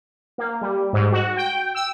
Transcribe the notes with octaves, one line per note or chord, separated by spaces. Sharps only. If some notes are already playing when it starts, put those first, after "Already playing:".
A#3
G3
G#2
F#4
G5
E6